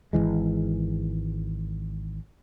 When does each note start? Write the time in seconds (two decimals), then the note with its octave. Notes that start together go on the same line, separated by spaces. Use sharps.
0.13 G#1 F2 E3 G#3